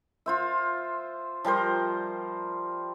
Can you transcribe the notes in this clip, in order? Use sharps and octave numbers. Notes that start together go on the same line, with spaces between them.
F4 C5 E5
F3 G3 A#4 C5